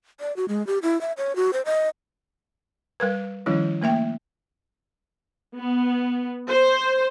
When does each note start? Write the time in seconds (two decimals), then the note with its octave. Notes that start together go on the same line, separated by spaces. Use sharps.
0.20 D5
0.36 F#4
0.49 G#3
0.67 G4
0.83 E4
1.01 E5
1.17 C#5
1.36 F#4
1.53 C5
1.65 D#5
3.00 G3 A#4 B4
3.46 D#3 F3 G3 C#4 E4
3.82 A3 A#3 E5 G5
5.57 B3
6.50 C5